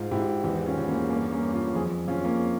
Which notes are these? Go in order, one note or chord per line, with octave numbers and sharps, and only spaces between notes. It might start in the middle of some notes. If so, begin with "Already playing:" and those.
Already playing: G#2 F4
G#2 E4 G4
E2 E4 G4
C#4 F4
E2
A#3 C#4
G2 A#3 C#4
A#3 C#4
G2
C#4 F4
F2 F4 G#4
F2 C#4 F4
A#3 C#4